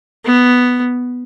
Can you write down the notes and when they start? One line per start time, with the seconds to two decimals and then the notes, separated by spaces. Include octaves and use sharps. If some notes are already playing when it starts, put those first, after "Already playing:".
0.25 B3